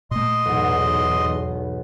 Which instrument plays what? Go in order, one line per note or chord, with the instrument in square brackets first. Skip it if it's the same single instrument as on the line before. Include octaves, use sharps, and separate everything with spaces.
[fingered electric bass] A#2 A3 [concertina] D#5 C6
[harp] B1 G#2 [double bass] E2